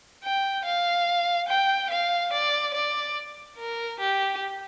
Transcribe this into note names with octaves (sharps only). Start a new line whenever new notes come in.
G5
F5
G5
F5
D5
D5
A#4
G4